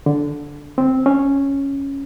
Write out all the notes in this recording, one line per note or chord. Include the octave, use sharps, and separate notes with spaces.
D3
C4
C#4